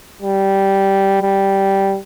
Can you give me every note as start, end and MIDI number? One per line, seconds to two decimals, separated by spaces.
0.22 1.17 55
1.22 1.98 55